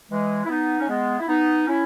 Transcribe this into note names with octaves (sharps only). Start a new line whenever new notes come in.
E3 G#3
E4
B3 D#4
C#4
G#3 B3
E4
B3 D#4
C#4 E4